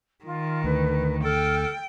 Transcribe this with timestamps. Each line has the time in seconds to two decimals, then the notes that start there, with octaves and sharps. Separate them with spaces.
0.25 D#3 F4
0.64 D2 B4
1.24 A4 G5 F6